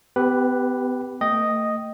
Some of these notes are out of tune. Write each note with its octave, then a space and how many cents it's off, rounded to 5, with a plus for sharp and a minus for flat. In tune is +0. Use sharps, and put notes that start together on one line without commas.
B3 +35 G4 +0 B4 +0
A3 +30 D#5 +0 G5 -10